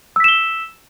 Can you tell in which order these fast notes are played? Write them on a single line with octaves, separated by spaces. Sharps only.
E6 B6 E7 G7